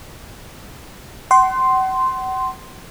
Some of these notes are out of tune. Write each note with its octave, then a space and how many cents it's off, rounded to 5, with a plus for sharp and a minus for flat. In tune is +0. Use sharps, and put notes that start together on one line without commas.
F#5 +35 C6 +0